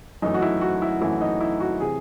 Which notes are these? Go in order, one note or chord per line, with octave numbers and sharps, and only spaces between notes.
F#2 E3 A3 D#4
F#4
E4
F#4
E4
F#2 E3 A3 E4
D#4
E4
F#4
C3 E3 G#4